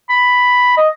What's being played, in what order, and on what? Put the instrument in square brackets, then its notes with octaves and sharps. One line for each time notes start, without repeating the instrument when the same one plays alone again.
[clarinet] B5
D#5